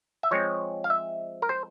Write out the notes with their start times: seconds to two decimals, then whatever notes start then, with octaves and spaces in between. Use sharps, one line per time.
0.23 E5
0.31 F3 G#3 C4 C#5
0.84 F5
0.90 E5
1.42 A#4
1.49 C5